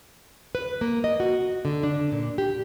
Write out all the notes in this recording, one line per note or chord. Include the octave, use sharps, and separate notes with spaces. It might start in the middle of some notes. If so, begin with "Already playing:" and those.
B4
A#3
D#5
F#4
D3
D4
A#2
G4